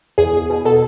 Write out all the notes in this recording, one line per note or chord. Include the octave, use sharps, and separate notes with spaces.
E2 G#4
E2
B2
B2 A4